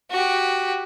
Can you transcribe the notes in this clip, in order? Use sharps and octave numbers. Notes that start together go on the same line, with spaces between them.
F#4 G4